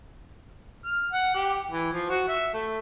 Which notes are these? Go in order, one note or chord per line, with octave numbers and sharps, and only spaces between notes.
F6
F#5
G4
E3
F3
F#4
E5
A3